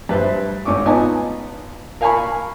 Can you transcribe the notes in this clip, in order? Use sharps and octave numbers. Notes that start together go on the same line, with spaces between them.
G2 B4 C5 E5
G#1 C#4 C#6 D6
B3 D#4 F4 D#5 G#5 A5
A#4 F5 G#5 A5 B5 C#6